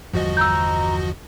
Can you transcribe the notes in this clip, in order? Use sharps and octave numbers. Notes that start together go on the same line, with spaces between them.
G1 E2 F3 G3 F#4 D#5
A#5 E6 G6